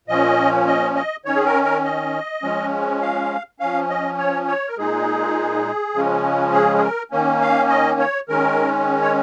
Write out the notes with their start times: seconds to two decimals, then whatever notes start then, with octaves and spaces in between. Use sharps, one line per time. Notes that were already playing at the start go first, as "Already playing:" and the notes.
0.08 A#2 F3 C#4 D#5
0.67 D#5
0.96 D#5
1.25 D#3 C#4 C#5
1.35 G#4
1.46 A#4
1.64 A#4
1.84 D#5
2.43 F3 G#3 C#4
3.02 F5
3.60 F3 C#4 F5
3.90 D#5
4.18 C#5
4.48 C#5
4.68 A#4
4.77 A#2 G#3 D#4 G#4
5.94 C#3 F3 G#3 C#4
6.53 G#4
6.77 G#4
6.82 A#4
7.11 D#3 A#3 C#4
7.42 F5
7.70 D#5
8.00 C#5
8.29 D#3 G#3 C#4 A#4
9.02 C#5